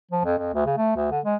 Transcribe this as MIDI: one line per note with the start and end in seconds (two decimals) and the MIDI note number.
0.12 0.24 53
0.25 0.36 41
0.38 0.53 41
0.54 0.66 38
0.66 0.74 49
0.77 0.93 57
0.96 1.07 38
1.12 1.20 50
1.25 1.36 56